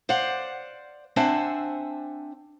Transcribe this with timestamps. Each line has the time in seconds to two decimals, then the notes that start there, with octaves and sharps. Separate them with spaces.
0.09 C5 D5 F5 F#5
1.16 C4 D4 C5 E5 F#5 G#5